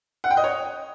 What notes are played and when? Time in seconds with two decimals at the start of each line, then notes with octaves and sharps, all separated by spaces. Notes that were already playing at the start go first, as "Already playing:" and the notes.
0.24 F#5
0.30 G5
0.37 D#5
0.44 C#5